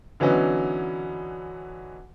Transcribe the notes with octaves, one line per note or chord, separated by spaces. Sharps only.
D3 E3 F#3 B3 C#4 D#4